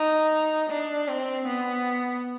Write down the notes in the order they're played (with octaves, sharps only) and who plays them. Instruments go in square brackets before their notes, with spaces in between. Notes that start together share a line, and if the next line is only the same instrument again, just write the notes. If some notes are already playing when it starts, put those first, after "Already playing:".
Already playing: [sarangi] D#4
D4
C4
B3